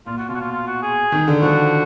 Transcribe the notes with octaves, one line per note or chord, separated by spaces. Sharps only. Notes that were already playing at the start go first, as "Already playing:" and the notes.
A#2 F4
F#4
B2 F4
F#4
F4
F4
F#4
G#4
D#3
D3
F3 F#4